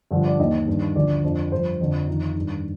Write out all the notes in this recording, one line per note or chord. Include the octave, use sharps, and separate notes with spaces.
G2 D3 F3
D5
D#2 D#3 D#5
G2 D#3
D2 D3 F3 D5
F2 D3 F3
G2 F3 C5
F2 D3 F3
F2 D#3 D#4
G2 D#3